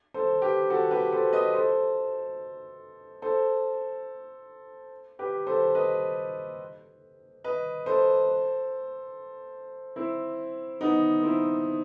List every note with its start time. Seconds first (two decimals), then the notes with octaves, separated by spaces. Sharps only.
0.14 A4 C5
0.42 G4 B4
0.70 F#4 A4
0.91 G4 B4
1.12 A4 C5
1.33 B4 D#5
1.54 A4 C5
3.22 A4 C5
5.19 G4 B4
5.47 A4 C5
5.75 B4 D#5
7.44 B4 D#5
7.86 A4 C5
9.96 C4 E4
10.81 B3 D#4
11.23 C4 E4